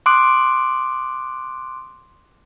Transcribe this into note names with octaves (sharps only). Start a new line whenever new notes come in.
C6 D6 D#6 F#6 D7